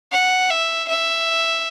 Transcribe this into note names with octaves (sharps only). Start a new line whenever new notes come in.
F#5
E5
E5